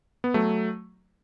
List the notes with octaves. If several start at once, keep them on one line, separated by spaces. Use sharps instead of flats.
B3
F#3 A3